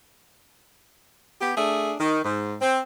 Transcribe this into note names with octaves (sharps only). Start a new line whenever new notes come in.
B3 G4
A3 D4 G#4
D#3
G#2
C4